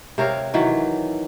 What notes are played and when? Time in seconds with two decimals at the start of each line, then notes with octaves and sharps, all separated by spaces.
0.18 C3 A#4 C#5 F5
0.54 D#3 E3 F#3